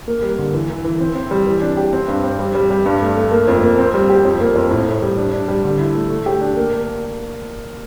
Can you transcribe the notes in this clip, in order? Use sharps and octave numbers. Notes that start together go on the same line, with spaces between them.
A#3
G3
D3
E3
E3
E3
C4
C4
G3
E3
D4
G4
C4
G2
C4
G3
G3
G3
G2
A3
A3
A#3
F2
A#3
C4
G3
G4
F2
A#3
F2
A2
A2
G3
D4
D4
G3
D3
E4
A3
A3
G4
D4
A#3